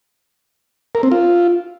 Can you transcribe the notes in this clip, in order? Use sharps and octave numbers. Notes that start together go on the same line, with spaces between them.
A#4
C4
F4